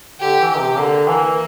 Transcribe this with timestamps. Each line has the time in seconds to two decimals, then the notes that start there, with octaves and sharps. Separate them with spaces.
0.20 D3 G4
0.40 E3
0.49 G4
0.59 C3
0.78 D3 A#3
1.07 E3 A#3